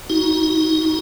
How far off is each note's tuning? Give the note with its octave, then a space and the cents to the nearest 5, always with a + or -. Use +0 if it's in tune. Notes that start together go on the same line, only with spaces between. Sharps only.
D#4 +30 F#4 +0